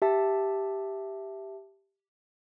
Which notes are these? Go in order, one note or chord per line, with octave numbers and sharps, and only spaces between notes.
G4 E5 A5